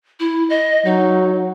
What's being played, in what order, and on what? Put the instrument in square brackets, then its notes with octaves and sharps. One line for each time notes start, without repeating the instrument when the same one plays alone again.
[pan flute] E4
D#5
[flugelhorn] F#3 [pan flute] D#4